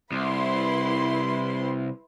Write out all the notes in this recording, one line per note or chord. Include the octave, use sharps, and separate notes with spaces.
C2 E4 B4 C6